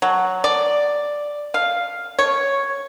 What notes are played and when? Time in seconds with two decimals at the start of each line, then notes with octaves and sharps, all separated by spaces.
0.02 F#3
0.44 D5
1.54 F5
2.19 C#5